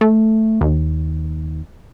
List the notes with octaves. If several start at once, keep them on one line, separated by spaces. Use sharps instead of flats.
A3
D#2